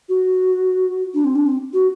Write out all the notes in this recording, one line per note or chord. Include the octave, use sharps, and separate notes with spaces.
F#4
D4
C4
D4
C4
F#4